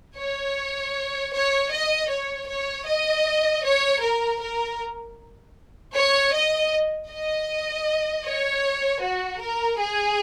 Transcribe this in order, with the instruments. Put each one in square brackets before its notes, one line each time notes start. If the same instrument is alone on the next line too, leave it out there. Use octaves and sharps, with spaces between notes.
[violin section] C#5
C#5
D#5
C#5
C#5
D#5
C#5
A#4
A#4
C#5
D#5
D#5
C#5
F#4
A#4
G#4